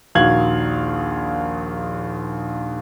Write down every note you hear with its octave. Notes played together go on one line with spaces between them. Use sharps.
A#1 D#2 F#4 F5 G#6 F#7